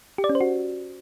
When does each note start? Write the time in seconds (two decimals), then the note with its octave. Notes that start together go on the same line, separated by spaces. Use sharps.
0.18 G4
0.24 D5
0.29 C#4
0.35 C5
0.41 F#4